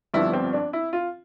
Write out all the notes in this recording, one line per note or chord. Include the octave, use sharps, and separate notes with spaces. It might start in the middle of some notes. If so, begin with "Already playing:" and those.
G1 G2 F3 B3 E4
C4
D4
E4
F4